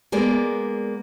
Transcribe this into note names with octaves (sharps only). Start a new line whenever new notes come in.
G#3 A#3 B3 D5